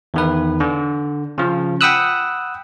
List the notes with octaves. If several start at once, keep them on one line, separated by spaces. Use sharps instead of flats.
E2 D#3 B4
D3
C#3 F3
F#5 G5 B5 D#6 E6 F#6